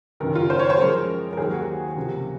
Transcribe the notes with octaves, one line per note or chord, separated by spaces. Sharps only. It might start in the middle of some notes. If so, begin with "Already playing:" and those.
F#1 F#2 D#3 A#4
F4
C5
C#5
C5
F#2 F3 G#3 A#4
A#4
D#2 D#3 F#3 A#3 G#4
F#4
C#2 C3 F3 A#3